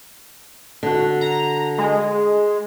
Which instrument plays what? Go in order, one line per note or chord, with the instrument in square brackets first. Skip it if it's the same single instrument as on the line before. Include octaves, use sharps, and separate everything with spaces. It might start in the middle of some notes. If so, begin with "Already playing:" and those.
[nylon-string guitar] D3 F#4
[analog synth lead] A#5
G#3